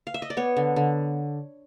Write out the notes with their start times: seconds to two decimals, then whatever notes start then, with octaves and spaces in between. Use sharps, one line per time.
0.07 F5
0.14 E5
0.22 D#5
0.30 D5
0.37 B3 C#5
0.57 D3
0.76 D3